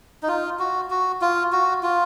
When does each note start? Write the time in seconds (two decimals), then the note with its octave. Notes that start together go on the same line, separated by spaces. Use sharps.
0.23 D#4
0.28 F4
0.59 F#4
0.90 F#4
1.22 F4
1.52 F#4
1.83 F4